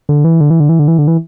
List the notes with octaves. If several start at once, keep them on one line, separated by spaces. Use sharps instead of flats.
D3
E3
D3
E3
D3
E3
D3
E3
D3
E3